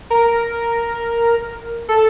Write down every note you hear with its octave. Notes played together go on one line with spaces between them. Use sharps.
A#4
A4